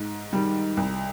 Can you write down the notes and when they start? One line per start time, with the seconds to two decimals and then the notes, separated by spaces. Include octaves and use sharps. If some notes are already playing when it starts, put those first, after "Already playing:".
Already playing: G#2
0.33 D#3 G3
0.77 C2